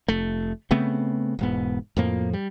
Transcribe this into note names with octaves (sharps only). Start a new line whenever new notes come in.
F1 A3
C#3 A3 B3 C4
E1 G#2 B3
F2 A2 F3 A#3
G3